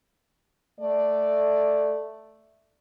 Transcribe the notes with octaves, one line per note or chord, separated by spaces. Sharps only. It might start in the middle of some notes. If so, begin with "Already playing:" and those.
A3 D5